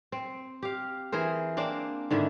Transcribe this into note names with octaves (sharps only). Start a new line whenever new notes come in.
C4
G4 F5
E3 G#4 A#4 C5
A#3 C4 D4
G#2 D3 D#3 E4